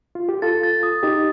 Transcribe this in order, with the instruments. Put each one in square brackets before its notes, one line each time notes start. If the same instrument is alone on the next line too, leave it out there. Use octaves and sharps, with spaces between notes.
[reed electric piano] F4
G4
[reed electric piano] F4 A4 [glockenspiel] A6
[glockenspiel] A6
D#6
[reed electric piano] D#4 G4 [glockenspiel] A6